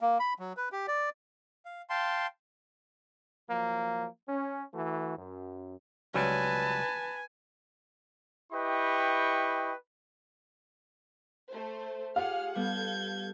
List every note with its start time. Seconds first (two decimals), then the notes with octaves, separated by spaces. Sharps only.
0.01 A#3
0.20 B5
0.39 F#3
0.57 B4
0.72 G4
0.88 D5
1.65 F5
1.90 F5 G5 A5 C6
3.49 F3 F#3 A#3
4.28 C#4
4.73 E3 A3 F#4
5.16 F#2
6.14 C#2 F#3 G3 B4 G#5 A5
8.53 E4 G4 B4 D#5 G5 C#6
11.49 A3 C5
12.16 F4 G4 G#4 F5 F#5 F6
12.55 G3 B3 A4 G6 G#6